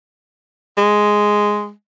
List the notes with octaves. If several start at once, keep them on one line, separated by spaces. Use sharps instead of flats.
G#3